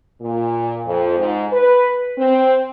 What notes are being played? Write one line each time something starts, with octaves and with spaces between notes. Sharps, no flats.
A#2
F2
G#2
B4
C4